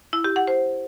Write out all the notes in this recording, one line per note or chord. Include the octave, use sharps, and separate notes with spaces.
E4
G4
F#5
C5